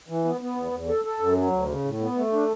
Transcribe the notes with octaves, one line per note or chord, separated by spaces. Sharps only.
E3
B3
B3
E2
E2
A4
A4
F#2
F#3
D2
C#3
A2
B3
A3
D4